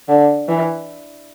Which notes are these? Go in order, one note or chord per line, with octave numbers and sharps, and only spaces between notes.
D3
E3